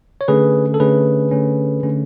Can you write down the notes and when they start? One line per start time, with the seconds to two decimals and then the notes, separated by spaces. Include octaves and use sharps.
0.21 C#5
0.28 D3 A3 C#4 G#4 B4
0.74 A4
0.80 D3 A3 C#4 G#4 B4
1.31 D3 A3 C#4
1.83 D3 A3 C#4